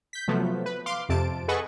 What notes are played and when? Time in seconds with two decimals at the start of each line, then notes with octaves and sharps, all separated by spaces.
0.13 G6 B6
0.28 C3 F3 F#3 A3 B3
0.66 B4
0.86 F5 C6 D6
1.09 F2 C3 A5 D7
1.48 G#4 A4 B4 D#5 F#5 C#6